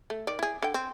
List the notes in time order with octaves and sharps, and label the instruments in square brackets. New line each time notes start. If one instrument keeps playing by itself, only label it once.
[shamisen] A3
D#3 D5
E4 G#4
D3 G5
C4